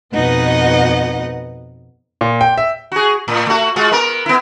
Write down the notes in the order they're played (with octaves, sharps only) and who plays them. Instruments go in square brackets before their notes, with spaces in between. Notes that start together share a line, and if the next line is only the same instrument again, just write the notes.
[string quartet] F2 B2 D#4 B4 D#5 F#5
[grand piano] A#2
G5
E5
[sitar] F#4 G#4
A2
A3 F#4
G#3 F4 F#4
B3 A#4
B3 E4